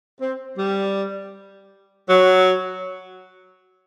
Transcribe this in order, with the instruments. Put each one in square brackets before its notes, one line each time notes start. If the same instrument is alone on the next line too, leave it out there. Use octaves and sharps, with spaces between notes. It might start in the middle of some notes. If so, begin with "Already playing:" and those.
[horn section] C4
G3
F#3